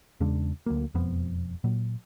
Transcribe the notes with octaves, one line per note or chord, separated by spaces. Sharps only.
E2 C#3 G#3 D4
D2 F#3 A#3
E1 F2 F3 B3
A#2 F#3